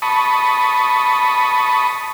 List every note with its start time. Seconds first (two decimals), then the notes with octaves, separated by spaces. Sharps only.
0.02 A5 B5 C#6 D#6